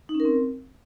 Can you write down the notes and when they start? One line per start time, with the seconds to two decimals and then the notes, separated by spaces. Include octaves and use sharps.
0.09 D#4
0.14 C#4
0.20 A#4
0.25 C4